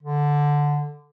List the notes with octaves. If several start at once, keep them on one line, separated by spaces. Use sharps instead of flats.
D3